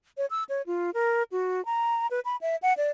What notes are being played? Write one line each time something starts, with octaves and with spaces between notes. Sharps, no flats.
C#5
E6
C#5
F4
A#4
F#4
A#5
B4
B5
E5
F#5
D5